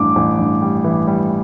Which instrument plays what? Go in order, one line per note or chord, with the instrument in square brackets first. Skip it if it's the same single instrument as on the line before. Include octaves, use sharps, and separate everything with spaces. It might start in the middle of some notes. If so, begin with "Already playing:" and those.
Already playing: [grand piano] A1 G2 [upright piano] D6
[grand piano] A1
G2
G3
E3
G3